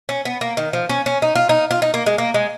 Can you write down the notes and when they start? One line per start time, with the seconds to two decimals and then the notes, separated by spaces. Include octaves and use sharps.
0.09 C#4
0.25 B3
0.41 A#3
0.57 D#3
0.73 F3
0.89 C#4
1.06 C#4
1.22 D#4
1.35 F4
1.49 D#4
1.71 F4
1.82 D#4
1.94 A#3
2.06 G#3
2.18 A#3
2.34 G#3